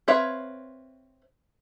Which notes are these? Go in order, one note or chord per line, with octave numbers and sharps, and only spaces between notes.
C4 B4 C#5 E5 F5